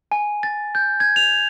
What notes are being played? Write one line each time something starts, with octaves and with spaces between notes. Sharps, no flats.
G#5
A6
G6
G#6
F7